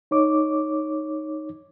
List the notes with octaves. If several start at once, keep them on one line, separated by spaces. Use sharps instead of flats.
D#4 C#5 D6